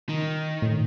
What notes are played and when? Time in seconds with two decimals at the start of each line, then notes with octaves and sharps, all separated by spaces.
0.09 D#3
0.62 A2